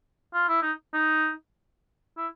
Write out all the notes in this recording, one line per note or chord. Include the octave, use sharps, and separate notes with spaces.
F4
E4
D#4
D#4
E4